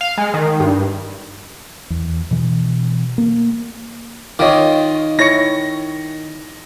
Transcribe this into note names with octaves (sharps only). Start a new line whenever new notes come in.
F5
G#3
D#3
G2
E2
B2 E3
A#3
D#3 F4 C#5 D#5 D6
E4 C#5 C#6 A#6 C#7